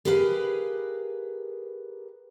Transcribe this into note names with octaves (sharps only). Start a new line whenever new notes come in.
G4 G#4 A#4 B4 F5